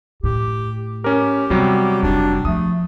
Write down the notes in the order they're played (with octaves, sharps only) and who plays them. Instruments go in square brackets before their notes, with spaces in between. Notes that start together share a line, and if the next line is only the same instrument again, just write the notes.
[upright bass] A2 [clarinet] G4
[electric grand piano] C#4 A#4 [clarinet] G4
[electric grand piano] C3 F#3 G3 [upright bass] B3
[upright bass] F1 [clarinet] D4
[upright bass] F3 [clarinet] A3 [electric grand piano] D#6